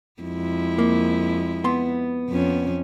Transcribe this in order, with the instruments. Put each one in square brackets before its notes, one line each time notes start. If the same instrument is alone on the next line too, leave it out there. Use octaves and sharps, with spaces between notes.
[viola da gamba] F2 G#3 E4
[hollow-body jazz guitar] A#3
B3 C6
[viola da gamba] F2 C#4